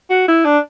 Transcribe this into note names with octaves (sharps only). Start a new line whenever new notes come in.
F#4
E4
D4